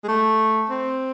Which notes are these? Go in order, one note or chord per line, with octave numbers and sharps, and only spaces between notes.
G#3
A3
C4